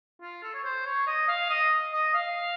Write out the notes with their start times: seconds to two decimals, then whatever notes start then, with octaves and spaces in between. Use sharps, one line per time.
0.21 F4
0.43 A4
0.54 C#5
0.64 C5
0.86 C#5
1.07 D#5
1.28 F5
1.49 D#5
1.92 D#5
2.14 F5